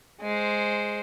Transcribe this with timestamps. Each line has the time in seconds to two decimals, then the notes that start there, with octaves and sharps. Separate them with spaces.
0.21 G#3 C5